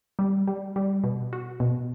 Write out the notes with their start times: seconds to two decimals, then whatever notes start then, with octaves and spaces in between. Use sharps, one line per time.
0.19 G3
0.48 G3
0.76 G3
1.04 B2
1.33 F#4
1.60 B2